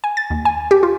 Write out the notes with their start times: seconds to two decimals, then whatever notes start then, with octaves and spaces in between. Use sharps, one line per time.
0.04 G#5
0.17 A6
0.30 D#2
0.45 G#5
0.71 G4
0.83 F4